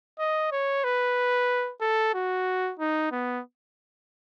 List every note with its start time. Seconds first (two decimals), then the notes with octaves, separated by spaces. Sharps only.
0.19 D#5
0.52 C#5
0.84 B4
1.81 A4
2.14 F#4
2.79 D#4
3.12 B3